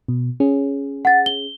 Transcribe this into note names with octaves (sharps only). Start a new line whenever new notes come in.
B2
C#4 G#4
F#5 A6
G7